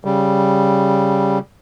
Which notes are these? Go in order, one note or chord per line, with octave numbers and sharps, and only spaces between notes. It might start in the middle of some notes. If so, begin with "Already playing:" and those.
C#3 G3